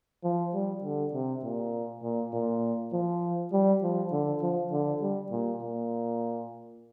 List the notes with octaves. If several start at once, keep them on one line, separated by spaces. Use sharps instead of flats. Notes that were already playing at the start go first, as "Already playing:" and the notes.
F3
G3
D3
C3
A#2
A#2
A#2
F3
G3
F3
D3
F3
D3
G3
A#2
A#2